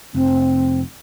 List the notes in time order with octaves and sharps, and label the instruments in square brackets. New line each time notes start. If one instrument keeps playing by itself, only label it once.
[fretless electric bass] F1 [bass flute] C4